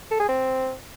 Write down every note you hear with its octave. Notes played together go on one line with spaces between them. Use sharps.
A4
G#4
C4